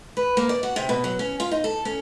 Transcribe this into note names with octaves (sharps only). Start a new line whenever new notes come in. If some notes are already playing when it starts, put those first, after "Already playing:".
B4
A#3
D5
F#4
C3
B2
F#3
C#4
F4
D#4
A4
C#4